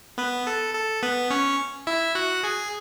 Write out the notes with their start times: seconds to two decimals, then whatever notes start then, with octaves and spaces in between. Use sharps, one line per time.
0.18 B3 B4
0.47 A4
0.75 A4
1.03 B3 B4
1.31 C#4 C#5
1.87 E4 E5
2.15 F#4 F#5
2.43 G#4 G#5